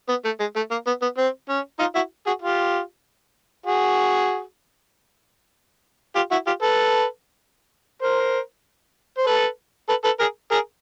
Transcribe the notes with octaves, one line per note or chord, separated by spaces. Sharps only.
B3
A3
G#3
A3
A#3
B3
B3
C4
C#4
D#4 F4
E4 F#4
F#4 G#4
F4 G4
F#4 G#4
F4 G4
E4 F#4
F4 G4
A4 B4
A#4 C5
C5
A4 B4
A4 B4
A4 B4
G#4 A#4
G#4 A#4